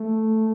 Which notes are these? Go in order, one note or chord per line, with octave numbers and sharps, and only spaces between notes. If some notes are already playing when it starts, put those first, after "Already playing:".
Already playing: A3